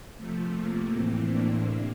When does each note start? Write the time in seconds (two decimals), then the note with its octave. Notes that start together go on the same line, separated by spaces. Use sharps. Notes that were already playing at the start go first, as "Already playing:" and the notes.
0.16 C3 F3 A3
0.53 A#3
0.89 A2 E3 A3 C4
1.26 A#3 D4
1.62 C3 A#3 D4